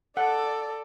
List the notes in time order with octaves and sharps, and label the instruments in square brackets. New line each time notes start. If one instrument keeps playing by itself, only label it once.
[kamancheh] A4 D5 [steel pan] F#5